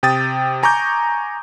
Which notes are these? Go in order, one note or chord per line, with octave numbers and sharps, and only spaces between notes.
C3 G5 D#6 A6
G#5 A#5 C#6 D6 G6